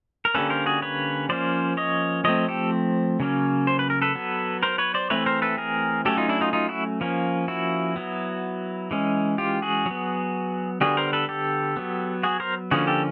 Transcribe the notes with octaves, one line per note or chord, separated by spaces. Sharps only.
A#4
D3 G3 A#3 C#4 A4 B4
A#4 C5
F#4 G#4
B4 C#5
F3 A#3 C#4 C5 D5
C#5 D#5
F3 A3 C4 C#5 D#5
G4 A4
C#3 F#3 A#3 C#4
C5
B4
A#4
A4 B4
F#3 B3
A#4 C5
B4 C#5
C5 D5
E3 A3 C4 B4 C#5
A#4 C5
A4 B4
G#4 A#4
F#3 A3 C#4 G4 A4
D#4 F4
D4 E4
D#4 F4
D#4 F4
E4 F#4
F3 A#3 C#4
E4 F#4
F#3 B3
E3 G#3 C#4
F4 G4
F#4 G#4
F#3 B3
D3 G3 B3 F#4 G#4
A#4 C5
A4 B4
G4 A4
F#3 B3
F#4 G#4
A#4 C5
D3 F3 A#3 C#4 F#4 G#4
G4 A4